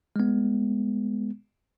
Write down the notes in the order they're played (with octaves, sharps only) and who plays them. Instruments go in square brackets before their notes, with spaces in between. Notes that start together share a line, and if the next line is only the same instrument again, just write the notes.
[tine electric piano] G#3 B3